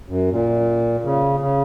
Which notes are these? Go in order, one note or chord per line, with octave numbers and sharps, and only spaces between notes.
F#2
A#2
C#3
C#3